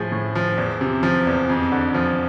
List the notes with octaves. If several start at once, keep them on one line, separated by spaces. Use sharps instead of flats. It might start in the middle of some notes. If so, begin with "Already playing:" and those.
Already playing: A2 F3 G#4
A2
F3
E2
C3
F3
E2
F2
D3
F3